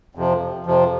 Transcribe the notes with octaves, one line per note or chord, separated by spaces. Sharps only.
F2 C3 F3
F2 C3 F3